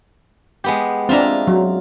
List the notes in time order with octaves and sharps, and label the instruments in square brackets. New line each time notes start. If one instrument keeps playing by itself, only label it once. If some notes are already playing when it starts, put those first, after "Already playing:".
[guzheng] G#3 B3 G4
[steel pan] C4 D4 [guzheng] F4 E5 A#5
[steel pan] F#3